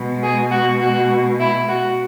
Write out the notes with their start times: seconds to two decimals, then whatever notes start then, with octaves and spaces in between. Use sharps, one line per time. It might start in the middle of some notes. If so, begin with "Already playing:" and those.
Already playing: B2 G#3
0.23 G#4
0.51 F#4
0.80 F#4
1.39 E4
1.68 F#4